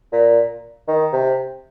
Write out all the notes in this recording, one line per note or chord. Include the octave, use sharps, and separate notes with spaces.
A#2
D#3
C3